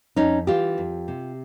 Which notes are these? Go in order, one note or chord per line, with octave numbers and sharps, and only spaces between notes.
F2 C#4 D#4
E3 F4 G4
F2
C3